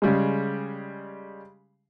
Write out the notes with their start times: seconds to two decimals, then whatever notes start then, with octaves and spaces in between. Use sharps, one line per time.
0.02 C#3 G3 G#3